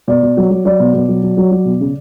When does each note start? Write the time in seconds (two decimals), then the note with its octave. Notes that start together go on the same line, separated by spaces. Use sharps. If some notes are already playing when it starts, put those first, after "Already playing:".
0.08 B2 D5
0.23 B2
0.37 F#3
0.50 F#3
0.65 F#3 D5
0.80 B2
0.94 B2
1.09 F#3
1.23 F#3
1.37 F#3
1.52 F#3
1.65 B2
1.81 C#3